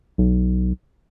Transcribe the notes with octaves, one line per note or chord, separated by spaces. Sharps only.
B1